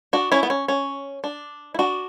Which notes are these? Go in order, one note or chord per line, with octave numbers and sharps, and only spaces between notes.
D4 F#4
C#4 E4
B3
C#4
C#4
D4
E4
D4 F#4